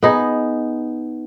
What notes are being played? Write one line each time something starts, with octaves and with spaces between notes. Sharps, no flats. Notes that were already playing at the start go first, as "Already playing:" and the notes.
B3 D#4 G#4